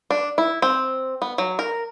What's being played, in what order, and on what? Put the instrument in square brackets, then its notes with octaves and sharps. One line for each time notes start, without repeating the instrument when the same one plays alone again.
[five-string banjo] D4
E4
C4
B3
F#3
A#4